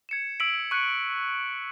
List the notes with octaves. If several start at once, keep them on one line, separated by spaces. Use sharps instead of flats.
G#6 C#7 E7
E6 B6 D7 F#7
C#6 F#6 C#7